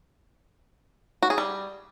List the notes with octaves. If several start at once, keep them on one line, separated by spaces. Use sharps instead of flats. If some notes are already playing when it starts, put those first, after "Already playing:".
F#4
G#4
G3